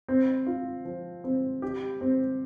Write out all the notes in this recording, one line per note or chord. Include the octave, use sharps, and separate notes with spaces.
C4
F4
F3
C4
G4
C4